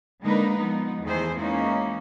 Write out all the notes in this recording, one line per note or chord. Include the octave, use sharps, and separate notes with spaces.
D3 G#3 A#3 D#4 A#4 B4
F3 B3 D#4
E2 D#3 A3 E4 G#4 C5
E3 G#3 A#3 C#4 D#4